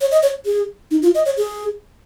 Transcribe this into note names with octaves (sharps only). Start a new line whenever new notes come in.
C#5
D#5
C#5
G#4
D#4
F4
D#5
C#5
G#4